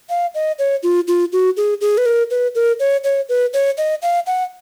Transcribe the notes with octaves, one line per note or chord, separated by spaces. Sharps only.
F5
D#5
C#5
F4
F4
F#4
G#4
G#4
B4
A#4
B4
A#4
C#5
C#5
B4
C#5
D#5
F5
F#5